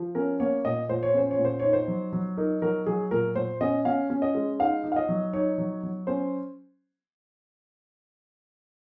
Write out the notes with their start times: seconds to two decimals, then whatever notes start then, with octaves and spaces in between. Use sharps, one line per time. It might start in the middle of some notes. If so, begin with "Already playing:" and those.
Already playing: F3
0.15 C#4 A#4
0.40 A#3 C#5
0.65 A#2 D#5
0.89 A#2 C5
1.03 C#5
1.14 C#4 C5
1.31 C#5
1.39 A#2
1.45 C5
1.60 D#4 C#5
1.73 C5
1.88 F#3
2.13 F#3
2.37 D#4 A#4
2.62 F#3 A#4
2.86 F#3 G#4
3.11 A#2 A#4
3.36 A#2 C5
3.61 C#4 D#5
3.85 C#4 F5
4.10 C#4
4.22 D#5
4.35 G#3
4.59 D#4 F5
4.84 D#4
4.92 F5
4.96 D#5
5.09 F#3
5.33 D#4 C#5
5.58 F#3
5.83 F#3
6.07 C#4 C5